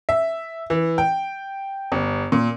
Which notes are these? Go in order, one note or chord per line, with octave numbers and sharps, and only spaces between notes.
E5
E3
G5
G1
A#2